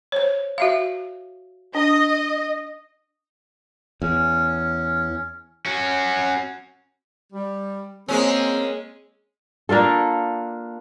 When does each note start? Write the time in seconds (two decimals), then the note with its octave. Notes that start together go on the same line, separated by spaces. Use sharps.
0.12 C5 C#5
0.58 F#4 E5 F5
1.75 D4 D#5
4.02 E2 C#4
5.66 C#4 F#4
7.32 G3
8.08 G#3 A#3 C4 C#4
9.69 A#3 D4 F4 A4